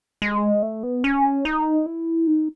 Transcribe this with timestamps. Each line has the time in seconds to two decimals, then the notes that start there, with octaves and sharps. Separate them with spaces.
0.22 G#3
0.62 A3
0.83 B3
1.04 C#4
1.45 D#4
1.86 E4
2.27 D#4